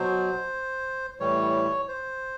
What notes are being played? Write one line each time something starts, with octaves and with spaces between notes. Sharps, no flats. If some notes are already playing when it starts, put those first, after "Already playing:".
Already playing: B2 F#3 C5
A2 E3 G3 C#5
C5